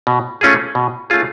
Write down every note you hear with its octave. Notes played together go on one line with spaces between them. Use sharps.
B2
A3 C#4 F4 G#4
B2
A3 C#4 F4 G#4